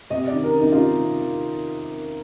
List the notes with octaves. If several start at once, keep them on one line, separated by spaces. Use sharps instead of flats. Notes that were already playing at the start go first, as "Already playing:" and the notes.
C3 D#5
D#3 D5
A#4
D#3
D#4
F4
C3 D#4
C3
D#3